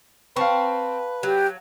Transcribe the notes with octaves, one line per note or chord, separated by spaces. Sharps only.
C4 B4 F5 A5 C#6
F#3 G4